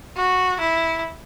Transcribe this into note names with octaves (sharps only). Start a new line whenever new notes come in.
F#4
E4